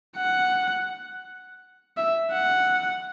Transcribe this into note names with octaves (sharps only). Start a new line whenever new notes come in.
F#5
E5
F#5